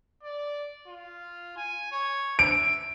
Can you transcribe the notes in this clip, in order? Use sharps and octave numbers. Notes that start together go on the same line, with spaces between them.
D5
F4
G#5
C#5
E5 D7